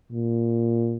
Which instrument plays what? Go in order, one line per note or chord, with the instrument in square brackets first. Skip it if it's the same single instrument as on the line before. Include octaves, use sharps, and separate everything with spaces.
[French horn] A#2